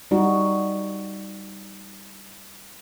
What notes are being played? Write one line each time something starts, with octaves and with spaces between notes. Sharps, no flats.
G3 D#4 F#4